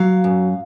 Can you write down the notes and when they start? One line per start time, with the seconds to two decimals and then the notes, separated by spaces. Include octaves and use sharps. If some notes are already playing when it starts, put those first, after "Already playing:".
Already playing: F#3 F5
0.24 F#2